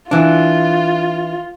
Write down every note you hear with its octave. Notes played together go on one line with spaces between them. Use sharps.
E3 D4 F4